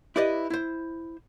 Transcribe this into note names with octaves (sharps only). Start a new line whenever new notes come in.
E4 G4 B4 D5 D#5
E4 C5